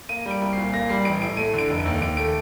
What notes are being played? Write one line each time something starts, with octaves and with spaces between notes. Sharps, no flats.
A#3 D#7
G3
D7
C2
A#2 C7
A#3 A#6
G3 C7
A1 D7
A2 D7
A3 D#7
D3 D7
F1
D7
D#2
D#2 D7
A3 D7